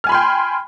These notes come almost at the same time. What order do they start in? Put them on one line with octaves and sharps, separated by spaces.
F6 G#5 B5 C6 G5